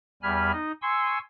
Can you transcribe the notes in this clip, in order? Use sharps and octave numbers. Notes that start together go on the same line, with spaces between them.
E2 G3 G#5 B5 F6
D#4 D#5
G#5 C6 C#6 E6